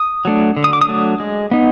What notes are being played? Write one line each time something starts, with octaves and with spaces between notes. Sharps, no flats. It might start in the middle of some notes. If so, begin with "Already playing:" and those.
Already playing: D#6
F#3 A3 D4
D3
D#6
D6
D#6
F#3 A3 D4
G#3
B3 D#4